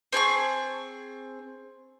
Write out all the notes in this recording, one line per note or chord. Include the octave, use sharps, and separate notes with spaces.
C4 G#4 A5 C#6